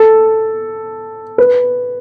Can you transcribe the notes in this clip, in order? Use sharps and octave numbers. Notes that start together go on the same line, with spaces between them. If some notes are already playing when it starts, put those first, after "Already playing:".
Already playing: A4
B4